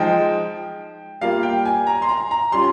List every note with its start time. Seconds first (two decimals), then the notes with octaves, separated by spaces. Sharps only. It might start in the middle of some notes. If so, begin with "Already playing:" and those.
Already playing: F3 G#3 D#4 G5
1.21 G3 A#3 F4 F5
1.43 G5
1.65 G#5
1.87 A#5
2.02 C6
2.09 A#5
2.31 A#5
2.52 G3 C#4 F4 C6